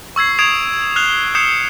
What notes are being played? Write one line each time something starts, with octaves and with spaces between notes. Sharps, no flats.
C#6 E6 G#6 C7
C#6 D#6 G#6 D7 E7 F7
F6 F#6 C7 F7 G7
D#6 G6 C7 C#7 E7